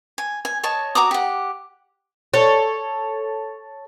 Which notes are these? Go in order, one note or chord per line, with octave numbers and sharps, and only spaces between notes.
G#5
G#5
C#5 D#5 A5 C#6
F#4 A#5 D6 D#6
G4 F#5
A4 C#5